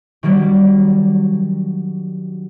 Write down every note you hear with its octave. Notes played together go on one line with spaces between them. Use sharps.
D#3 F#3 G3 A#3 D4